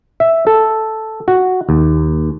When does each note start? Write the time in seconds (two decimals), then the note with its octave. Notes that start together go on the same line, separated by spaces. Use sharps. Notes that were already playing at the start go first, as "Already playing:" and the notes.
0.20 E5
0.47 A4
1.28 F#4
1.69 D#2